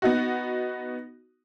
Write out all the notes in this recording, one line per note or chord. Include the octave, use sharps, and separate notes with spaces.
B3 D#4 F#4